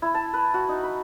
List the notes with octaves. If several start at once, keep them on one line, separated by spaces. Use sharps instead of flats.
E4
A5
B4
F#4
D#4
B5